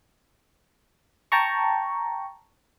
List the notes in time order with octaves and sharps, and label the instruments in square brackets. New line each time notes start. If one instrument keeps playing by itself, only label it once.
[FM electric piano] G5 A5 A#5 C#6